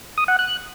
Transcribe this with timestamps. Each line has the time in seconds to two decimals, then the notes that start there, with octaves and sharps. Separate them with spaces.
0.18 D#6
0.28 F#5
0.39 F#6